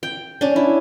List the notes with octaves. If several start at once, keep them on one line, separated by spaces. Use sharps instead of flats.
G5
C#4 D4
E4